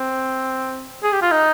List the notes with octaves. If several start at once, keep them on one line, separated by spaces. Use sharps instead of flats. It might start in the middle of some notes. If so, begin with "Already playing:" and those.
Already playing: C4
G#4
G4
F4
D#4